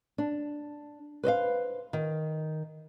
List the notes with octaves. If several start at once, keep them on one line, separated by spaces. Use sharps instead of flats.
D4
B4 C5 D#5 F5
D#3